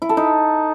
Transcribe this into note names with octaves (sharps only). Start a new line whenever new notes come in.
E4
A4
D#4